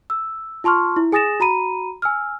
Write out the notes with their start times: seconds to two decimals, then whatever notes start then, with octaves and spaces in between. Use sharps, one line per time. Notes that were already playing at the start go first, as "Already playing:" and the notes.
0.10 E6
0.64 F4 A5 C6 C#6 F6
0.96 E4
1.12 G#4 G#5 D#6 A6 A#6 E7
1.40 F#4 A#5 B5 D#7
2.02 G#5 E6 F6